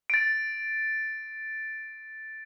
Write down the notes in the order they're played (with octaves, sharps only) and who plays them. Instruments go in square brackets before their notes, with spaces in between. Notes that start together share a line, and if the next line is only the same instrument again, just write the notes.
[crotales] A6 D7